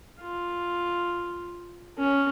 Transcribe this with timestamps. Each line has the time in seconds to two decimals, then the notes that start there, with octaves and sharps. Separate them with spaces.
0.21 F4
1.98 C#4